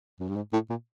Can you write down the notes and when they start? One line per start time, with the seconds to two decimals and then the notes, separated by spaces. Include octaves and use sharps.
0.20 F#2
0.28 G2
0.36 G#2
0.53 A2
0.70 A#2